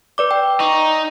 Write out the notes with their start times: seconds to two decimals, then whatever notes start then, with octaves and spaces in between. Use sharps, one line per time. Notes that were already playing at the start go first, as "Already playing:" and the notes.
0.18 B4 D5 D6
0.31 G5
0.60 D#4 C#6